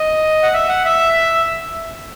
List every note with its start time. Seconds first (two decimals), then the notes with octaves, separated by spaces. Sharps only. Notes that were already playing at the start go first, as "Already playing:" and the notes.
Already playing: D#5
0.43 F#5
0.54 E5
0.69 F#5
0.85 E5